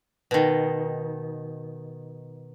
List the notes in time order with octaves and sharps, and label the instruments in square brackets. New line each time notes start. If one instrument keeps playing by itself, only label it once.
[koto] B2 D#3